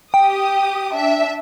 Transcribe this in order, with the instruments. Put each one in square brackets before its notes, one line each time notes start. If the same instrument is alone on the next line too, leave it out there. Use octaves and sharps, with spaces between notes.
[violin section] G4 D#6 [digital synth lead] G5
[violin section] D4 E5